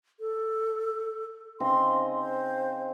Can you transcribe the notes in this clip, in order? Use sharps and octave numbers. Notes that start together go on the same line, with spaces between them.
A4
C#3 C4 D#4 C6
C5